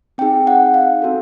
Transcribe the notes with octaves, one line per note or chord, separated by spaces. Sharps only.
C4 D#4 G#4 G5
F#5
F5
C4 D#4 F#4 A4